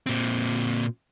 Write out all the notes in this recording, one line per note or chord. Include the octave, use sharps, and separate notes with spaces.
A#2 C4